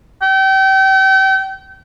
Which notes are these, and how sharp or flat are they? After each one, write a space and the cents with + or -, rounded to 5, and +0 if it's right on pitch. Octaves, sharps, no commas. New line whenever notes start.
G5 -35